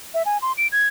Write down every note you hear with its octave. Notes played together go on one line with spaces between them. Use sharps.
E5
G#5
C6
D7
G#6